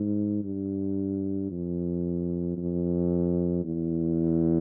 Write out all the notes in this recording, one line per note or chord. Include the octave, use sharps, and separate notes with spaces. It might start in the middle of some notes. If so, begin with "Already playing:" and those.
Already playing: G#2
G2
F2
F2
E2